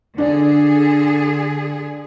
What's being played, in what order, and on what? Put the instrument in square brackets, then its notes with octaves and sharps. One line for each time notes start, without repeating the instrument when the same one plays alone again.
[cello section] D3 G#4 [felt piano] D4 D5